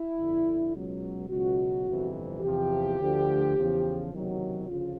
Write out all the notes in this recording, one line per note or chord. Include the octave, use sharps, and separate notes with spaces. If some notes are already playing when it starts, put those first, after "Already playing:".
Already playing: E4
G1 F2 D3
C#2 B2 F#3
C#2 B2 F#3 F#4
G1 F2 C3 E3
E2 C3 F3 G4
D2 D3 F3
E2 C#3 F3
F#1 E2 C3 D#3 F#3
D2 C#3 F3 F4